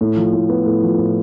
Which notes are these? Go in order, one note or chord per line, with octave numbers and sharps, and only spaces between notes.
A2
F3
A2
B3
A2
F3
A2